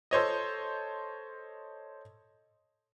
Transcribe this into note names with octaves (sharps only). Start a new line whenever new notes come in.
A4 C5 C#5 D#5